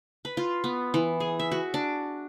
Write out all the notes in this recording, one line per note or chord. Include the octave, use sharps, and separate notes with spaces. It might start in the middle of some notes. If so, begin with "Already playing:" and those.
B4
F4
B3
E3
G#4
E5
F#4
D4